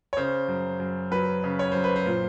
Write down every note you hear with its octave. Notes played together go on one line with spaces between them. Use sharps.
C#5
C#3 C5
F#2
F#2
F#3 B4
C#3
C#5
F#2 C5
B4
C5
A#2